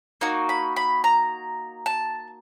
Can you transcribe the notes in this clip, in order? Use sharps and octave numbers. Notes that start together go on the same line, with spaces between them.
A#3 D#4 F#4
B5
B5
A#5
A5